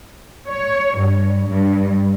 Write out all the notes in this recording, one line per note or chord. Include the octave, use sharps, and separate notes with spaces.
C#5
G2
G2